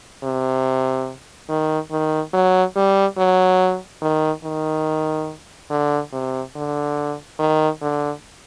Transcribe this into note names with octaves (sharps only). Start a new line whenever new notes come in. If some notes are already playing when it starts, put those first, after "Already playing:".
C3
D#3
D#3
F#3
G3
F#3
D#3
D#3
D3
C3
D3
D#3
D3